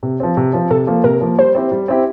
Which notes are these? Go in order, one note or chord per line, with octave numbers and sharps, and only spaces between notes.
C3
F3 C4
C3
F3 C4
C3 A4
F3 A#3
C3 A#4
F3 A#3
G3 C5
C4 E4 G4
G3
C4 E4 G4